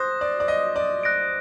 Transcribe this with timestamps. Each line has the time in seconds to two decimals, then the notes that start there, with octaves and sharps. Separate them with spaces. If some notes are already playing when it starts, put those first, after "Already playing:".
Already playing: C5 D#6 F#6 A#6
0.21 D5
0.40 D5
0.48 D#5
0.76 D5
1.03 F#6 A#6 D7